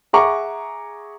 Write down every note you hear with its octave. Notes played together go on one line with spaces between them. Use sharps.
G#4 E5 F#5 A#5 C#6 D6